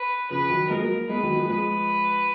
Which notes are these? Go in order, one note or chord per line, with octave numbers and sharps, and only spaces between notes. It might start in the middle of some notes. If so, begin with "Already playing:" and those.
Already playing: B4
C#3 F3 B4
D#3 F#3
F3 G#3 A#4
F#3 A#3
G#3 B3 B4
D#3 F#3
F3 G#3
F3 G#3 B4